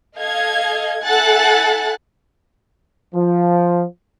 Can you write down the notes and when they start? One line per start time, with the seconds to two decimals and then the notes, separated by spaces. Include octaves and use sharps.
0.15 A4 D#5 F5 G#6
1.02 E4 A4 F#5 G#5 F#6 A6
3.15 F3